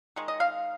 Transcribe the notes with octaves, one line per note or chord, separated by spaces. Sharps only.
D#3 G#3
D#5
F5